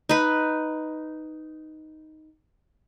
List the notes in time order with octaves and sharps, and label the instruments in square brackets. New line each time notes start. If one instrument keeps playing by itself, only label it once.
[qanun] D#4 B4